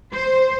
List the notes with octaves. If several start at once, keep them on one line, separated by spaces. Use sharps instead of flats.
C5